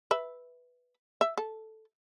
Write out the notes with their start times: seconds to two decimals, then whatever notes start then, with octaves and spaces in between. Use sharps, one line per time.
0.11 B4 E5
1.21 E5
1.38 A4